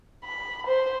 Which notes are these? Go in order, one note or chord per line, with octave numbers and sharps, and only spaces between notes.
B5
C5